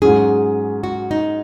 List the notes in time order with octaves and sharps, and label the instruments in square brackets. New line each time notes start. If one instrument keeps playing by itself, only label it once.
[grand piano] G#2 F#3 C#4 [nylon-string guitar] G#4
[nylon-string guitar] F#4
D#4